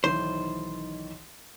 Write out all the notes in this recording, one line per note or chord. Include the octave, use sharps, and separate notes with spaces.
B1 D#3 E3 C5